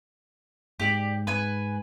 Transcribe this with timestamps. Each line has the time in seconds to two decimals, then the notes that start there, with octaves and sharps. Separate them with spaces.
0.80 G#2 G4 D5
1.27 G#2 B4 G#5